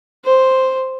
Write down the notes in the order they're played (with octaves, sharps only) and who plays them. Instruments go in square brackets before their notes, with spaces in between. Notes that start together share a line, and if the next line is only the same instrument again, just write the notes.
[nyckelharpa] C5